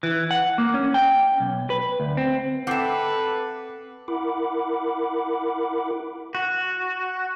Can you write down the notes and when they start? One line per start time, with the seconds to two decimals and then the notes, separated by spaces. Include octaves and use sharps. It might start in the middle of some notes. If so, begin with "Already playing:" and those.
0.03 E3
0.31 F#5
0.58 A#3
0.74 C#4
0.94 G5
1.40 B1
1.70 B4
2.00 D2
2.17 C4
2.67 C4 A4 B4 E5 F#5 D6 C7
4.08 E4 A#4 F#5 B5 D6
6.35 F#4